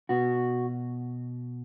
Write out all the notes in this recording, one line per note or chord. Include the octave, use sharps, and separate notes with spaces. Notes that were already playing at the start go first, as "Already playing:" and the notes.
B2 F#4